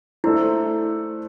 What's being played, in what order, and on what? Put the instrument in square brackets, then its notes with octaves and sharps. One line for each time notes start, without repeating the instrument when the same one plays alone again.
[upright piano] A3 D4 A4 C5 [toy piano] E4